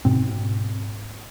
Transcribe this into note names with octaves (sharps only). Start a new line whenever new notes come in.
G#2 B2 C4